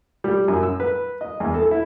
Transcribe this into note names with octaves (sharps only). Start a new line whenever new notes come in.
G3
F#2
E6
B4
D#5
E2
A4
E4